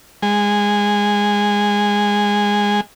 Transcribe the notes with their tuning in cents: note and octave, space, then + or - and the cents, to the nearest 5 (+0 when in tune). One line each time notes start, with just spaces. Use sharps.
G#3 -15